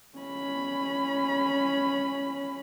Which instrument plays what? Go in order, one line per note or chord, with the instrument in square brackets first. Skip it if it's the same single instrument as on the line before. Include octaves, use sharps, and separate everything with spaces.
[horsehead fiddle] C#4 B5